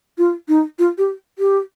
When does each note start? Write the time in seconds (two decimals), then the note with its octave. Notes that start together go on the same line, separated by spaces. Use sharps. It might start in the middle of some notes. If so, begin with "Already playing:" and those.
0.18 F4
0.48 D#4
0.79 F4
0.98 G4
1.39 G4